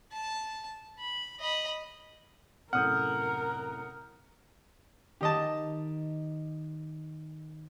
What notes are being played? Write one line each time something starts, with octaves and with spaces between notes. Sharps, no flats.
A5
B5
D#5 B5
F#2 A2 C3 A#4 F#5 D#6 F6 G6
D#3 G4 D#5 A5